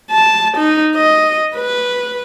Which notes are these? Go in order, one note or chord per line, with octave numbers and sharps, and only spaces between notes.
A5
D#4
D#5
B4